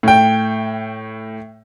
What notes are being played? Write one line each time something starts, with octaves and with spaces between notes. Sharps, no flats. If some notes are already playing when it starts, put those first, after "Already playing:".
A2 G5